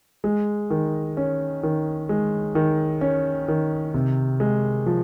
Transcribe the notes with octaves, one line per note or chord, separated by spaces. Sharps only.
G#3
D#3
C#4
D#3
G#3
D#3
C#4
D#3
C3
G#3
F3